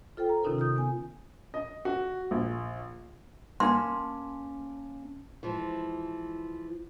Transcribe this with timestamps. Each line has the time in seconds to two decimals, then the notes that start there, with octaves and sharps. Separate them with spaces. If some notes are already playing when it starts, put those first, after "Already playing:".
0.17 F4 A4 C5 G5
0.29 A#5
0.43 C3 D#3 C#4 D#4 F4 A#4
0.58 F4 D#6 G6
0.76 B3 G#5
1.54 D#5
1.85 F#4
2.31 A#1
3.60 A#3 C#4 A5 C6
5.43 E3 F3 G#3